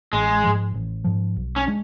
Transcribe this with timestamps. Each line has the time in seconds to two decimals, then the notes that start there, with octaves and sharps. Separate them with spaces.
0.13 A1 G#3
0.44 G#2 F3
0.74 A1
1.04 G#2 F3
1.36 B1
1.56 C#4
1.67 G#3 D4